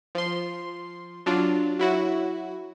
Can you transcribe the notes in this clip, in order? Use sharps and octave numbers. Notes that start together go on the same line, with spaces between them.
F3 C6
F#3 D4 F4
F#3 E4 F#4